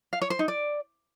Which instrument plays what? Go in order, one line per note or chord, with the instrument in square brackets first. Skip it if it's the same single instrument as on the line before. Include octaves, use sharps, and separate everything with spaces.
[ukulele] F5
C#5
C5
D#4
D5